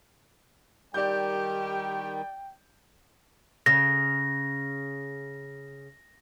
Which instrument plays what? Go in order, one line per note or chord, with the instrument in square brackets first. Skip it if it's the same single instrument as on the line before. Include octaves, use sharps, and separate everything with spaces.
[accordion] D#3 G3 [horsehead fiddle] G4 [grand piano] D5 G6 [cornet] G5
[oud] C#3 [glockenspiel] A#6